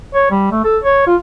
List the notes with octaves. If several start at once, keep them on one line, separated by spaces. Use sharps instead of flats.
C#5
G3
A3
A4
C#5
F4